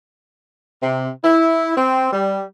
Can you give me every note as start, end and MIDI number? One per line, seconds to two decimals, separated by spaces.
0.81 1.08 48
1.24 1.76 64
1.77 2.12 60
2.12 2.42 55